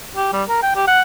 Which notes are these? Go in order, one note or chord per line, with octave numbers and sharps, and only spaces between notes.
G4
G3
A#4
G5
G4
F#5